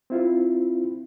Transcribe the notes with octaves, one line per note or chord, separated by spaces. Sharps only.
C4 E4 F4